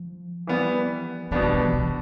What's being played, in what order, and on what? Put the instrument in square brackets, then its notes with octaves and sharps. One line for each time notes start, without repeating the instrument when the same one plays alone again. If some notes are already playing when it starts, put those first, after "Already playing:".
Already playing: [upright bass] F3
[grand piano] E3 G3 B3
[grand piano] B2 G3 B3 D4 [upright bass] E3
[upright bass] F3
E3
C3